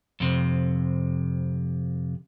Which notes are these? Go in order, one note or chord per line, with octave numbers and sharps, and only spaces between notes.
F2 C3